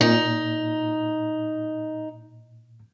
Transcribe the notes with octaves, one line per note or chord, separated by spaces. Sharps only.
A#2 D#4